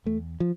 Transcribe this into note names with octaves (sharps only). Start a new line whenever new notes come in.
E2 A3
F3